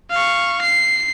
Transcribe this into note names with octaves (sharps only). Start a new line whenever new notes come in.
F5 C#6
C7